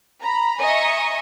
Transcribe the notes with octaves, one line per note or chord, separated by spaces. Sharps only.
A#5 B5
D#5 E5 G#5 A#5 C#6 D#6